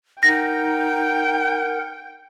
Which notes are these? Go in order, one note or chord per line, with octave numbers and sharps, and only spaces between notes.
D#4 A#4 F#5 G5 A#6